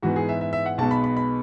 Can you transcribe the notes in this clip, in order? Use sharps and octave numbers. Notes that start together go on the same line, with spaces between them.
G#2 E3 B3 F#4
G#4
E5
E5
E5
F#5
B1 B2 G#3 B3 A5
B5
B5
B5